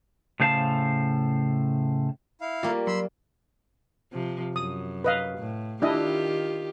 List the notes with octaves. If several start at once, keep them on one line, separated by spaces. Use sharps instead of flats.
A2 C#3 C5 F5 A5
E4 F5
G3 A#3 F4
F#3 B5 C6 E6
C3 F3
F#2 D#6
B4 D#5 F5
A2
D#3 D4 E4 F4 G4 D#5